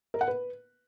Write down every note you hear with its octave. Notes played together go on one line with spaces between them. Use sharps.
A#4
F#5
B4